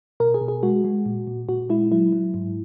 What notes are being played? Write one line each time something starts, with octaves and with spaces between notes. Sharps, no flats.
B2 A#4
G#4
B2
G#4
G#3 F#4
G#3
A#2
A#2
A#2 F#4
G#3 E4
F#3 E4
F#3
G#2